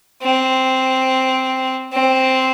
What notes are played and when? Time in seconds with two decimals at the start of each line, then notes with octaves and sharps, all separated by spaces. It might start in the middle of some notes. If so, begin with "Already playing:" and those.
0.22 C4
1.92 C4